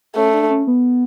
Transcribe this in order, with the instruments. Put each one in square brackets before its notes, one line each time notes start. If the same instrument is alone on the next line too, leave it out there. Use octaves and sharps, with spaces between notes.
[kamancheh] A3 [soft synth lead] C#4
[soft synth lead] D4
C#4
B3